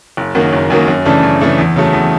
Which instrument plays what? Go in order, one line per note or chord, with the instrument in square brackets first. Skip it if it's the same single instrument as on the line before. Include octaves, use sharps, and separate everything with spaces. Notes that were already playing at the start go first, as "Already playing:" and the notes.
[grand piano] F#1
F#2 D#3 F#3 A#3
F#1
F#2 D#3 F#3 A#3
F#2
C#3 E3 A3 D4
F#2
C#3 E3 A3 D4
E2
C#3 F#3 A3
E2